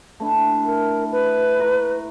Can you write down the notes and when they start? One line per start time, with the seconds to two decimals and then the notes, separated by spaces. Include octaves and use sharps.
0.20 A3 D4 E4
0.65 A#4
1.11 B4
1.59 E4 A#5 C#6